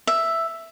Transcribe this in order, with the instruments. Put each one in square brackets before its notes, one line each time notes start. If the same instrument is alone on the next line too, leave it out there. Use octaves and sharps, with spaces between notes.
[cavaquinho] E5